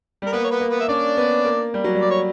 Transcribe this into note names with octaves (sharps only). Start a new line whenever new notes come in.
G3 A#4
A#3 B3 B4
C#5
B3 B4
A#3
B3 B4
E5
C#4 D4 D5
B3
A#3
G3
F#3
G3
D5
C#5